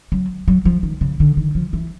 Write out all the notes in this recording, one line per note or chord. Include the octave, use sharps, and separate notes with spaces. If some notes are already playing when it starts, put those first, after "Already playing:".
F#3
F#3
F3
D#3
C#3
D3
D#3
F3
E3